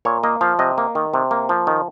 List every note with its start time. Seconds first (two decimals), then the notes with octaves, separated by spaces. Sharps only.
0.05 A#2 C#5
0.24 A#3 D#5
0.41 F3 F5
0.59 C3 D#5
0.78 A#3
0.95 D#3
1.14 C3
1.31 A#3
1.49 F3
1.67 D#3